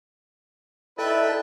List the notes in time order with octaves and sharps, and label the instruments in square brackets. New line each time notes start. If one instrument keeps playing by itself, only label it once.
[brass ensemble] D#4 E4 D5 [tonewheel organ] A4 A5 [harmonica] B4 E5 G5